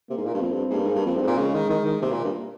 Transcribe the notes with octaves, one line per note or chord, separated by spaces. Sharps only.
C3 A#3
G#2
A#2
G2
F2 C4
G2
G#2
G2 A#3
G#2
G2
F2 C4
G2
G#2
A#2
C#3 G#3
D#3
D#3
D#3
C3 A#3
A#2
G2